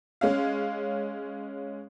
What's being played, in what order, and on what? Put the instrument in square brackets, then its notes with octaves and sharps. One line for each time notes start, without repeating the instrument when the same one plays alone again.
[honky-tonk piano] G#3 C#4 F5